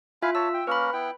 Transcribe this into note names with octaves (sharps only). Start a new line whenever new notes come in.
E4 F4 E5 F5 G#5
C#5 A5 E6
G5
A#3 C#4 A#4 B4 B5
B3 E4 G5